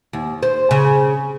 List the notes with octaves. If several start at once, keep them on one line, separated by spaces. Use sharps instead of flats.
D#2
C5
C#3